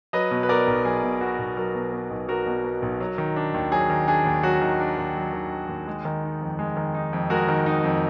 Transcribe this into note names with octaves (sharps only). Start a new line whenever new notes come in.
F#3 B4 D#5
B2
B4
B3 A#4 D5
B1
F#3 G#4
B2
B3 F#4
B1
F#3 F#4 A#4
B2
B3
B1
F#3 F#4 A#4
B2
B3
B1
F#3
D#3
D4
D#2
F#3 G#4
D#3
D4 G#4
D#2
F#3 F#4
D#3
D4
D#2
F#3
D#3
D4
D#2
G#3
D#3
D#4
F2
G#3
D#3
D#4
F2
G#3 F#4 A#4
D#3
D#4
F2